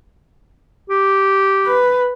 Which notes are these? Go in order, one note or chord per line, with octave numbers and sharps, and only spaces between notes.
G4
B4